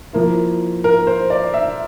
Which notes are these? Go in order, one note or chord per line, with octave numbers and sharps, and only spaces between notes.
F3 A#3 E4
A#4
C5
D5
E5